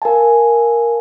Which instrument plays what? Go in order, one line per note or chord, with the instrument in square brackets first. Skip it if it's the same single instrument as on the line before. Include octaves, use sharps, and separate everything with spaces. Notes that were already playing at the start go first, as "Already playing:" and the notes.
[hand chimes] A#4 F5 G#5 A5